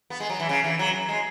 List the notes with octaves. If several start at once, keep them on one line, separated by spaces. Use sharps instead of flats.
B3
G#3
F#3
E3
C#3
E3
F#3
G#3